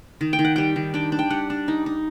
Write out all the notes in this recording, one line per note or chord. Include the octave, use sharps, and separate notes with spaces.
D#3
G5
D#3
F#5
G3 G5
D#3
D4 G5
D4
G5
G3 F#5
D4
D#4
D#4